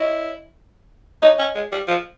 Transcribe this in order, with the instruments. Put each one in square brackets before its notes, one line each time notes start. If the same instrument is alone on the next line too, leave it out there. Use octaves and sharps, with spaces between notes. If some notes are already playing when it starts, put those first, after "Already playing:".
Already playing: [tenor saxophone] E4 [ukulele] C#5 D#5
[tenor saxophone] D#4 [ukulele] C#5 D#5
[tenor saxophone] C#4
G#3
G3
F3